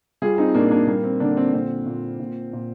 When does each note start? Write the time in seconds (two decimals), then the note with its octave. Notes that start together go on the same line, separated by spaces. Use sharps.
0.22 G3 F4 G#4
0.38 C4 D#4
0.54 A#2 A#3 D4
0.71 A#3 D4
0.87 G3 A#3
1.04 C4
1.20 D3 A#3 D4
1.37 C4
1.53 A#2 C4
1.86 A#2
2.19 A#2
2.53 A#2